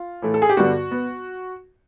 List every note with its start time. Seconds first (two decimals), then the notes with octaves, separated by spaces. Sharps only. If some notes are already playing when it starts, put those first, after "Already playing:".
Already playing: F4
0.22 A2 E3 A3
0.34 A4
0.42 G#4
0.49 G4
0.57 G2 D3 G3 B3 F#4
0.91 B3